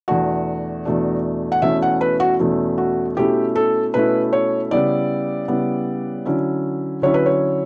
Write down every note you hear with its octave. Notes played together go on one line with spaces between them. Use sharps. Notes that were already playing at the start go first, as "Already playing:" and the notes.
E2 B2 A3 D4 F#4
E2 B2 A3 D4
F#5
E2 B2 A3 C#4 E4 E5
F#5
B4
F#4
E2 B2 A3 C#4 E4
F#4
B2 A3 C#4 E4 G4
A4
B2 A3 C#4 E4 B4
C#5
C#3 G3 B3 E4 D5
C#3 G3 B3 E4
D3 F#3 C#4 E4
D3 F#3 C#4 E4 C#5
B4
C#5